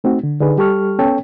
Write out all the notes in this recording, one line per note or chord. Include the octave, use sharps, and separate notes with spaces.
A3 C4 D#4 F#4
D3
D3 D4 D#4 G#4 B4
G3 G4 A4 C#6 F6
B3 C#4 A4 C#5 G5